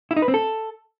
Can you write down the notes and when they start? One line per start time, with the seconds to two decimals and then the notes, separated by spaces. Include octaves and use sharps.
0.11 E4
0.16 D#4
0.22 B4
0.28 C4
0.34 A4